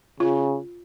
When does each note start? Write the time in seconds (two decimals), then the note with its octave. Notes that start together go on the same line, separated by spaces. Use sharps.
0.20 C#3 F4